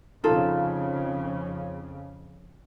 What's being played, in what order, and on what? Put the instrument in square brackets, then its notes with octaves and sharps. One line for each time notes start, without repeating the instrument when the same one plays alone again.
[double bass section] F2 C#3 [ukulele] D#4 F4 A4